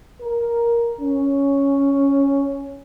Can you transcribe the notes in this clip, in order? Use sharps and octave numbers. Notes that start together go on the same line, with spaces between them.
A#4
C#4